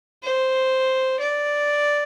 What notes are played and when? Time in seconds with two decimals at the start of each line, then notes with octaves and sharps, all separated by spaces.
0.23 C5
1.20 D5